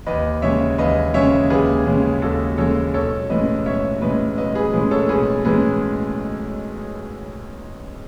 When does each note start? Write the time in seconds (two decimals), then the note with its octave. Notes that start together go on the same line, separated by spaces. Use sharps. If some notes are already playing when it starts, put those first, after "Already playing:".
0.06 D#2 B4 D#5
0.42 C#3 G#3 C#4 C#5 E5
0.78 D#2 B4 D#5
1.14 C#3 G#3 C#4 C#5 E5
1.50 D#2 G#4 B4
1.86 C#3 G#3 C#4
2.22 D#2 F#4 A4
2.58 C#3 G#3 C#4 A4 C#5
2.94 B1 A4 C#5
3.30 A2 G#3 C#4 B4 D#5
3.66 B1 C#5 E5
4.01 A2 G#3 C#4 B4 D#5
4.38 B1 B4 D#5
4.55 G#4 B4
4.73 A2 G#3 C#4 G#4 B4
4.91 A4 C#5
5.09 B1 G#4 B4
5.45 A2 G#3 C#4 G#4 B4